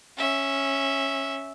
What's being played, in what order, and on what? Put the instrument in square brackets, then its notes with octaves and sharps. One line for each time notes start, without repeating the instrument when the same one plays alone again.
[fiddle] C#4 E5